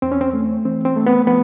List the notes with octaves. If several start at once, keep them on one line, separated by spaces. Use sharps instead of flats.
E2 C4
C#4
C4
A3
E3 C4
C4
A3
B3
F3 B3